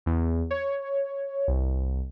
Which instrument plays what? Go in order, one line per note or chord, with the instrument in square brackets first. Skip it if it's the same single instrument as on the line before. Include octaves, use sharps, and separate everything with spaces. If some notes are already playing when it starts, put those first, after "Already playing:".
[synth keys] E2
C#5
C2